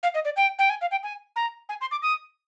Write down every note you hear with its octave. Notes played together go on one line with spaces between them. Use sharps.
F5
D#5
D5
G5
G5
G#5
F5
G5
G#5
A#5
G#5
C6
D6
D#6